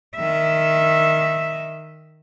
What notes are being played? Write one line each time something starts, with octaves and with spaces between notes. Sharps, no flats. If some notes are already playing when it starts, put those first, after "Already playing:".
D#3 E5